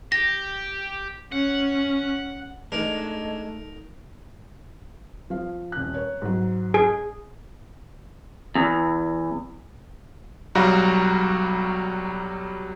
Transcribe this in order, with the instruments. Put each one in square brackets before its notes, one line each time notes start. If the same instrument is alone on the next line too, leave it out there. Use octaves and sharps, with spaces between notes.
[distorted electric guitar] G4 [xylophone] A#6
[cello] C#4 [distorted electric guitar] F#5
[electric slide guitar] G#3 D4 [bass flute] A3 [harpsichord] D#4 A#4
[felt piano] F3 F5
D#1 F#6
A#4 C#5
G#2 F#3
[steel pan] G#4
[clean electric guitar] E2
[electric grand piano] B1 F#3 G3 F#4 F5 A#5